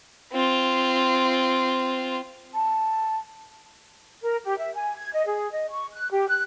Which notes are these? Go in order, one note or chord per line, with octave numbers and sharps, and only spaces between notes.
C4 F4
A5
A#4
G4
E5
G#5
G#6
D#5
G#4
D#5
C#6
F#6
G4
F#6